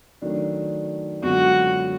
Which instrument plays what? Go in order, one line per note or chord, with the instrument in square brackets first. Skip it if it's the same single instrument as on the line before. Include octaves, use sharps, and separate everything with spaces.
[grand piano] D#3 F#3 A3 D4
[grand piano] F#2 D3 F3 G#3 B3 [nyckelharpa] F#4